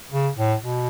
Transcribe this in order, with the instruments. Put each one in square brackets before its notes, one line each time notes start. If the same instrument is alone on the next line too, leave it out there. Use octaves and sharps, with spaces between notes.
[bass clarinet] C#3
A2
B2